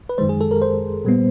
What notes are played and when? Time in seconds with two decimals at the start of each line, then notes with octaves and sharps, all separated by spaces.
0.09 B4
0.18 F#2 D#3 G#3 C5
0.29 G#4
0.41 A4
0.51 A#4
0.62 C5
1.05 A#2 G3 B3